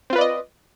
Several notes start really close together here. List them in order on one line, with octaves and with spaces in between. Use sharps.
C4 F4 B4 D5 D#5